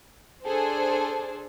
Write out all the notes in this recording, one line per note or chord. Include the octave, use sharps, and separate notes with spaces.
D4 G#4 A4 C5